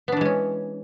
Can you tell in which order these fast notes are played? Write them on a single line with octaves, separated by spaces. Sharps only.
B3 D4 E3 G#3 C#4